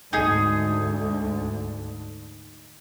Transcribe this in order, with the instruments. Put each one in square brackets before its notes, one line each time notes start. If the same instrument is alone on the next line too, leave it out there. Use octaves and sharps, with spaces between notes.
[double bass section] D2 G#2 D3 [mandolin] D#4 G#4